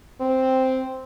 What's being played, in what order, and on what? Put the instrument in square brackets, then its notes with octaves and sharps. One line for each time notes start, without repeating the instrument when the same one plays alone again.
[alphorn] C4